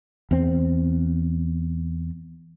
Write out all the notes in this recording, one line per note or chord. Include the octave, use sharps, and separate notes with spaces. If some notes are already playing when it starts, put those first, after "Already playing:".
E2 C4